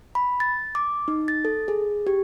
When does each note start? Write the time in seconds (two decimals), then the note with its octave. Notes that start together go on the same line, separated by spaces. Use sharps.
0.15 B5
0.40 A6
0.75 D6
1.08 D#4
1.28 A6
1.45 A4
1.68 G#4
2.07 G4